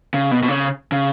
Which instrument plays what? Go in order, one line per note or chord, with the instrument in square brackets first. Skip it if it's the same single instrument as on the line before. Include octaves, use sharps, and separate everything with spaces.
[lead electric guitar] C#3
B2
B2
C#3
C#3